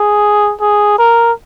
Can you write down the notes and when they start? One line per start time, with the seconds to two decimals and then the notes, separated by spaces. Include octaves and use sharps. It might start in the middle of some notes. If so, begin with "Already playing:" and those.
Already playing: G#4
0.61 G#4
0.98 A#4